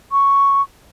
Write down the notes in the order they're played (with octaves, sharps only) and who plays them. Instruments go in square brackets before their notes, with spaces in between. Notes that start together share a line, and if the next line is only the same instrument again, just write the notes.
[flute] C#6